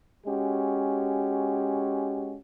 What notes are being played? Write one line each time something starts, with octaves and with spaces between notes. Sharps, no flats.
G#3 C#4 F#4 G4